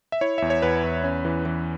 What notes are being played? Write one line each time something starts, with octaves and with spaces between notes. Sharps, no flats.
E5
E4 C#5
E2 E5
C#5
E2 B4
E2
C#4
E3
E3